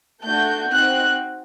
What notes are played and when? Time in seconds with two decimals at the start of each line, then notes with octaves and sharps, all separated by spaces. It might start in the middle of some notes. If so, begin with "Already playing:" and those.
0.23 A3 D4 F#4 G6
0.70 C4 D#4 F#4 F#6